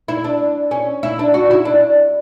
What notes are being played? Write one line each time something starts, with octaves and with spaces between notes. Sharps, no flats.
E4
D4
C#4
E4
D4
F#4
E4
D4